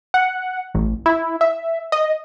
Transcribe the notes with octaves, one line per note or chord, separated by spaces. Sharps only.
F#5
A1
E4
E5
D#5